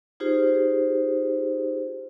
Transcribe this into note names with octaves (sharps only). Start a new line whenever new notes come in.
D#4 F4 G4 G#4 C5